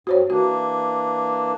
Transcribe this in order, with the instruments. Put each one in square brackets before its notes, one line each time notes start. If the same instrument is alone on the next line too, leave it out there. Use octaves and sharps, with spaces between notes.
[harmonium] G2 [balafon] F#4 C5 C#5
[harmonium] E3 A#3 D4 [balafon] F#4